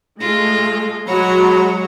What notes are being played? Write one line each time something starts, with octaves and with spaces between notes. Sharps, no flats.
G#3 A3 F4 A#6
F#3 G#3 F#4 C#5 B5